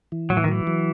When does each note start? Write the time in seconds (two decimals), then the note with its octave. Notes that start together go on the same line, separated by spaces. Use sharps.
0.12 E3
0.30 A2 F#3
0.37 E3
0.44 D#3
0.48 E3 F#3
0.67 F#3